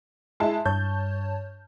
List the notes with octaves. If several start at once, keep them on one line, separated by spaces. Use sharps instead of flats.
G#3 E4 A5
G2 C#5 A5 G6